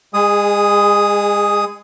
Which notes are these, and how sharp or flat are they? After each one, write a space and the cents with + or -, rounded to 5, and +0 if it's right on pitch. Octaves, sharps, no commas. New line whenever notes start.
G#3 -30 G#4 +0 D#6 +0